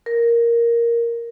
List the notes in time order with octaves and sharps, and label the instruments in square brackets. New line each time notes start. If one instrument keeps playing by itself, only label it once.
[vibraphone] A#4